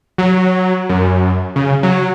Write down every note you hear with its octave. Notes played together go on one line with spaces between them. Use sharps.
F#3
F#2
C#3
F#3